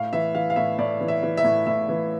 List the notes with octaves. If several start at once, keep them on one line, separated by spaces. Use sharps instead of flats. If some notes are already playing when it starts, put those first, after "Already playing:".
Already playing: A2 F5
E3 E5
E3 F5
F5
A2 E5
A2 D5
E3
E5
E3
E5
A2
A2 E5
E3